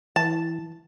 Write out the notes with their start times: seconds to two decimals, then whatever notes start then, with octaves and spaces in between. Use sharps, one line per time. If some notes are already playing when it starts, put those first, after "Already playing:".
0.16 E3 A5